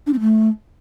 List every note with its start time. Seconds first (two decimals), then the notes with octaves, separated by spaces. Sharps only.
0.07 D4
0.13 C4
0.20 A3